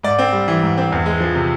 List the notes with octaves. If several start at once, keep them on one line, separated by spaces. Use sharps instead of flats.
G#2 D5
C4
G3
E3
G#2
C4
E2
G#3
F3
C3